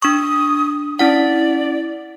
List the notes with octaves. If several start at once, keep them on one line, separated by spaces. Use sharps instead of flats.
D4 C#6 D#6
C#4 E4 D5 F#5